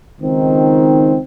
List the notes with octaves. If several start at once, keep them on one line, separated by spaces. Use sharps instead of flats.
C#2 D#3 C4 D#4